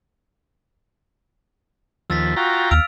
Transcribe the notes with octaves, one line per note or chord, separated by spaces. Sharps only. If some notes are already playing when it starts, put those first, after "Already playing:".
D#2 F3 E6 A6 B6
F4 F#4 G5 A#5
D#2 F5 E6 D7 F7